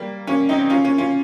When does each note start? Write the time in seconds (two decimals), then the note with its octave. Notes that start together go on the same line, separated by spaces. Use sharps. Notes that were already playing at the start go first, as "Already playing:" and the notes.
Already playing: G3 A#3
0.27 A#3 C#4
0.49 C4 D#4
0.70 C#4 F4
0.84 A#3 C#4
0.98 C#4 F4